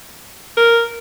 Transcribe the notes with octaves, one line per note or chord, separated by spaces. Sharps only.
A#4